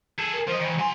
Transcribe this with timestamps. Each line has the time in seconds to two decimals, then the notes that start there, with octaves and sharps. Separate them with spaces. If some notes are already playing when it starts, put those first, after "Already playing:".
0.19 G#4 A4
0.34 A#4
0.47 F3 C5 D#5
0.59 D#3 E3
0.79 F#3 G#5 C6